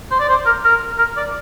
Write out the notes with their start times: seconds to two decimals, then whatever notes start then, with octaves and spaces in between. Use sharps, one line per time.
0.11 C5
0.20 D5
0.29 C5
0.46 A#4
0.64 A#4
0.98 A#4
1.17 D5